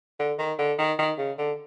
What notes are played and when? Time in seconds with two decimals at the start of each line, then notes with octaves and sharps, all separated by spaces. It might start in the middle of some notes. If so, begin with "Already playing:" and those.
0.19 D3
0.39 D#3
0.59 D3
0.79 D#3
0.99 D#3
1.18 C#3
1.38 D3